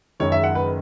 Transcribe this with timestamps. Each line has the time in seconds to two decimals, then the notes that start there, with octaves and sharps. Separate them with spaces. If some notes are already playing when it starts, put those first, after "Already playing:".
0.20 F#1 F#2 D#3 G#3 C#5
0.32 E5
0.44 F#5
0.55 B4